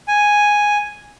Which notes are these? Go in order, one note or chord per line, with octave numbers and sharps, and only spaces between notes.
G#5